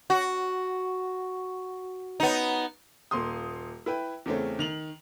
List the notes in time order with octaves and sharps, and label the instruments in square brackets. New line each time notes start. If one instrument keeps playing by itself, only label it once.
[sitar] F#4
B3 D#4
[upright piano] D#1 A#3 C6 D#6
E4 B4 G5
E2 C#3 A3 C4 C#4
D#3 F7 F#7